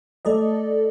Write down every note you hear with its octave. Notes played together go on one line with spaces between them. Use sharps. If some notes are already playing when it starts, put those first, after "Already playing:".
A3 A4 D5 D#5